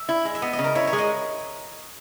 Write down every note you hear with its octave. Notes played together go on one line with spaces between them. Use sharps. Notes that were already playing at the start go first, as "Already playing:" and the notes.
Already playing: E5
E4
G#3
E5
B3 D#5
D#5
C#3
A#4
E4 C#5
C#5
G#3
D#5